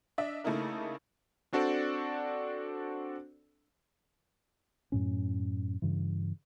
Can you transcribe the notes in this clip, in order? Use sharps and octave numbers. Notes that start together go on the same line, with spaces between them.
D4 D#5 E5
C#3 A3 A#3 D#4 E4 A#4
C4 D4 F#4 A4 C5 D5
F#2 A2 C#4
G2 C#3 E3